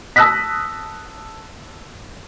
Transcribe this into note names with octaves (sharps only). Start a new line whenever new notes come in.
A5 D#6 E6 F#6 A#6 B6